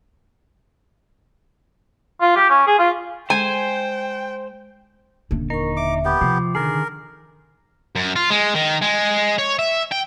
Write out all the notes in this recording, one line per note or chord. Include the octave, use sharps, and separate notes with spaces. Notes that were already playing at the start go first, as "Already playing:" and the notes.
F4
G4
C#4
G#4
F4
G#3 C5 G5 G#5
D#1 D3
D#4 A#4 C#6
E5 D6
B3 G4 D6
C3 F3
D3 D#3 G#4 A#4
F#2
F4
G#3
D#3
G#3
C#5
E5
G5